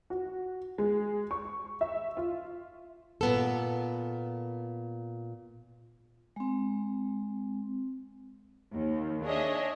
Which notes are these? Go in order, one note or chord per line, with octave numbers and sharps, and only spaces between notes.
F#4
G#3
C#6
E5
F4
A#2 B3 A4
G#3 C4
D#2
D4 G#4 C#5 D#5 E5